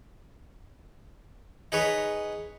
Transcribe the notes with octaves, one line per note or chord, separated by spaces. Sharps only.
D#4 G#4 B4 C#5